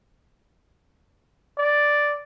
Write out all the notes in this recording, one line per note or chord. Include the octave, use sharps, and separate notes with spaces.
D5